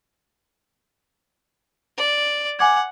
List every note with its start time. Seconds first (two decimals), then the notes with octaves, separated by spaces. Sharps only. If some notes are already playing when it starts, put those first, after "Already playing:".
1.98 D5
2.59 F#5 G#5 D6 G#6